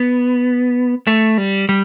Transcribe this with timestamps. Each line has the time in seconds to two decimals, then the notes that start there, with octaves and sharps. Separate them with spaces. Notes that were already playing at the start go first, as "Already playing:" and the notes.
Already playing: B3
1.07 A3
1.38 G3
1.69 G3